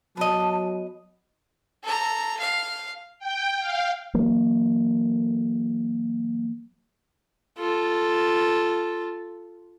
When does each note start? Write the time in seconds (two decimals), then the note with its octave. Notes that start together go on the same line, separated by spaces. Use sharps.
0.17 F#3 B3 D#5 A5
1.84 A4 A#5
2.40 F5
3.19 G5
3.60 F5
4.14 E3 F#3 A#3
7.58 F4 A4